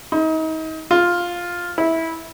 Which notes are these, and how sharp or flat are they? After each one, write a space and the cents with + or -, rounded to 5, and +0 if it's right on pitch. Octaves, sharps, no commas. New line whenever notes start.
D#4 +35
F4 +5
E4 -15